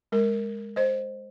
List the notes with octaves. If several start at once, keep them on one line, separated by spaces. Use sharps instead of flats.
G#3 A#4
C5 D#5